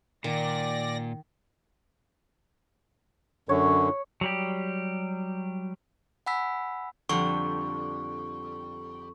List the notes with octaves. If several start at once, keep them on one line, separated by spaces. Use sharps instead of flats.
A#2 D#3 D5 A#6
F#2 D3 C#5
F#3 G3 G4
F#5 G#5 B5 E6 B6
F2 D3 G3 C#6